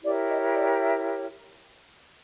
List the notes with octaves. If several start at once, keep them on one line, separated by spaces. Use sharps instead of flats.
E4 G4 A#4 C#5 D5
D#5
D5
E5